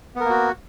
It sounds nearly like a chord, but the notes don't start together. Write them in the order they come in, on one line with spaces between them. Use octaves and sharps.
B3 A#4 A#3 F#4